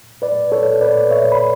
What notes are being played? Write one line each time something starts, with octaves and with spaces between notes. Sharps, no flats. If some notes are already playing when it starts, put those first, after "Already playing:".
B4 D5
A4 C#5
B4 D5
C#5 E5
B5